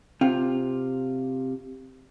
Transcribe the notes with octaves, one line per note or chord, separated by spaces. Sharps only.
C3 F4